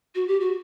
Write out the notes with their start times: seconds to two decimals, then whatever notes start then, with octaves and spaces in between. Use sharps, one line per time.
0.15 F#4
0.28 G4
0.40 F#4